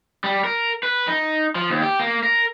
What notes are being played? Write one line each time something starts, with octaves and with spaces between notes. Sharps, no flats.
G3
A#4
B4
D#4
F3
D#2
G4
A#3
A#4